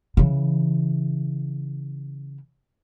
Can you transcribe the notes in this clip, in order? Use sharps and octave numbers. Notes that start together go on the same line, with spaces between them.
C#3 E3